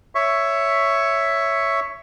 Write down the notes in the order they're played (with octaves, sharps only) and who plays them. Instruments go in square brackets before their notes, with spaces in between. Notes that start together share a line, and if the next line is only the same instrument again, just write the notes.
[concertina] C#5 E5 C#6